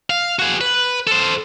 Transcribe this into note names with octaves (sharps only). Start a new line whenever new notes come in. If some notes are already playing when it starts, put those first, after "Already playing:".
F5
F#4 G#4
B4
A4 C5